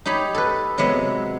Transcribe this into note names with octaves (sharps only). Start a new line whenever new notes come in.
D#4 G4 C#5 B5
A4 B4
C3 F#3 G#3 B3 E5